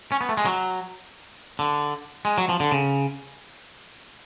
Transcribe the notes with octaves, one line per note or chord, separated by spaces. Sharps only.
C#4
B3
A3
G#3
F#3
D3
G#3
F#3
F3
D3
C#3